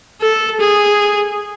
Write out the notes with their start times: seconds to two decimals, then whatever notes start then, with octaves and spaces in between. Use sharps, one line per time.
0.21 A4
0.60 G#4